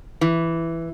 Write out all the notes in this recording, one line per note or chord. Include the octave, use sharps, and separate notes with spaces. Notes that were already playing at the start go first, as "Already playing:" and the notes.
E3